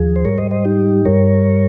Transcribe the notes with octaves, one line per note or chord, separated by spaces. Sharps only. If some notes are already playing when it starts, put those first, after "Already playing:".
Already playing: D#2 F3 G#4
C5
G#2 G3 A#4 C#5
C5 D#5
C5 D#5
D#4 G4
G2 G3 A#4 C#5